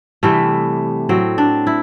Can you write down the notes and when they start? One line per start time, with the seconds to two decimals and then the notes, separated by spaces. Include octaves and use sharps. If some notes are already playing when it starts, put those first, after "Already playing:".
0.23 C3 E3 G3 A3
1.09 A2 F#3 C4
1.38 D4
1.67 E4